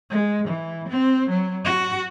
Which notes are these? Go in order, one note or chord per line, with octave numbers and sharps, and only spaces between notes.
G#3
E3
C4
F#3
F#4